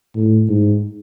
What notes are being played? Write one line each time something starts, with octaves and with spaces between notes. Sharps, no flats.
A2
G#2